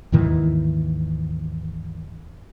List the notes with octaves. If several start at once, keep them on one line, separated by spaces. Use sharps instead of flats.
D#2 G#2 D#3 E3